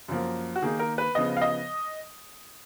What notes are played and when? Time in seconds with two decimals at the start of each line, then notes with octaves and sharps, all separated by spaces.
0.08 F#2 F3 A#3
0.56 F#4
0.62 D#3 A#3 D#4 G#4
0.79 A#4
0.98 B4
1.15 C#3 F3 B3 D#5
1.37 F5
1.42 D#5